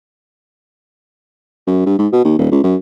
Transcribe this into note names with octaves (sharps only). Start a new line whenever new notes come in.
F#2
G2
G#2
B2
D#2
D#1
C#2
F#2